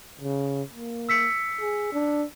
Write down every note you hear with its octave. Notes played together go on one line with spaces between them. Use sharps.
C#3
A#3
E6 B6 C#7
G#4
D4